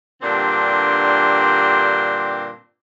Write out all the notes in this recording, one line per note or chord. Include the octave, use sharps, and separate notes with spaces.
G2 A#2 D3 C4 D4 G4